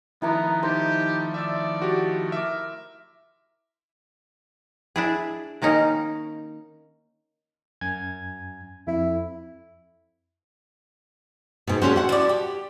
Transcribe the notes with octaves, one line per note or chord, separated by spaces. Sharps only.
D#3 F3 A3 B3 E4 A#5 D6
D#4 G4 C5
D5 E5 E6
F#4 G4
A#4 E5 D6
D4 E4 G#4
D#3 A#3 C#4 D#4
F#2 G#5 G#6
F2 E4
G#2 B2
D3 G#3 C#4 F#4 C5
F#4 F#5
F3 E4 D5
G4